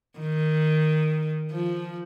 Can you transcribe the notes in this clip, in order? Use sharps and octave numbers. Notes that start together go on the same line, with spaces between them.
D#3
F3